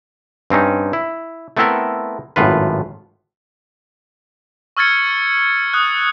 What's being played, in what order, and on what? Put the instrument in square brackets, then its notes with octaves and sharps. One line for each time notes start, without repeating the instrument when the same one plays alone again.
[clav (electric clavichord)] G2 C4 C#4 D#4
E4
A3 B3 C4 E4 A4 A#4
G#1 F#2 A2 F4 B4
[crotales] C#6 E6 F6 G#6 A6 C#7
D#6 F#6